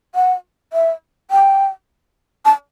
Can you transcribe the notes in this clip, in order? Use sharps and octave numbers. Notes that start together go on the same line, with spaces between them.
F#5
E5
G5
A5